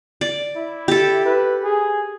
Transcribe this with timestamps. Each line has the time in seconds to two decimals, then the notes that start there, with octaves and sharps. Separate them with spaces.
0.21 D5
0.56 E4
0.88 G4 A4
1.25 B4
1.64 G#4